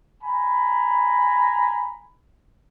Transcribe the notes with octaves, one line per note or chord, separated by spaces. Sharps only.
G#5 A#5 B5